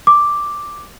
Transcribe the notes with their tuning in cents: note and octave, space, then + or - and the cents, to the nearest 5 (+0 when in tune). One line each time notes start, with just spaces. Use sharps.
D6 +0